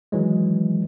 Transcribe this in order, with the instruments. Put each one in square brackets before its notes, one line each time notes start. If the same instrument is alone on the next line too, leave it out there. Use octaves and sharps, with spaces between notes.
[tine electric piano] D#3 E3 F#3 G#3